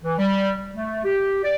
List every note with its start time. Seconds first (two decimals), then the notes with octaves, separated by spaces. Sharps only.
0.03 E3
0.18 G3
0.73 A3
1.04 G4
1.44 D5